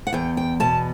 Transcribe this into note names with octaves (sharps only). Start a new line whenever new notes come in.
F#5
E2 G5
G5
B2 A5